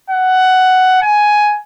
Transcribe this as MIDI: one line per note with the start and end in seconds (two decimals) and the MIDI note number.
0.10 1.02 78
1.02 1.58 80